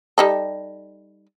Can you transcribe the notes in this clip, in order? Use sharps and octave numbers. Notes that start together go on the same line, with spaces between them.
G3 D#4 A4